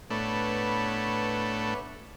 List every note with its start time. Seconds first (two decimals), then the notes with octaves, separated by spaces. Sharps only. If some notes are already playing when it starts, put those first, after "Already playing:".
0.10 A2 A3 B3 D4 B4 C#5